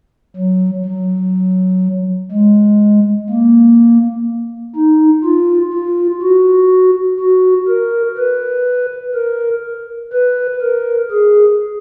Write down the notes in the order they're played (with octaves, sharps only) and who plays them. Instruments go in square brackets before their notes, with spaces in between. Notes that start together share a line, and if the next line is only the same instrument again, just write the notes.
[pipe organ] F#3
F#3
G#3
A#3
D#4
F4
F4
F#4
F#4
A#4
B4
A#4
B4
A#4
G#4